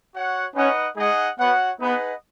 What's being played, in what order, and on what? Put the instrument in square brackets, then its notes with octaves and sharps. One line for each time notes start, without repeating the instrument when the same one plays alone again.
[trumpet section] F#4 C#5 F#5
[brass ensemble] C#4 [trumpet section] D#4 B4 D#5 F#5
[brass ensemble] G#3 [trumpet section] D#4 G#4 D#5 F#5
[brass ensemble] B3 [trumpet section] F#4 C#5 F#5
[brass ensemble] B3 [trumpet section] D#4 G#4 B4 D#5 F#5